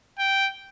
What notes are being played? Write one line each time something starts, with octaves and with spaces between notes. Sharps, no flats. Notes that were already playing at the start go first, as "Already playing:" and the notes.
G5